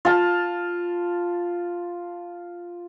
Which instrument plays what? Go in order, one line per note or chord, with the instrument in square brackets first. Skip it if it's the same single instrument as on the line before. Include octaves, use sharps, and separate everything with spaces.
[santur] F4 A5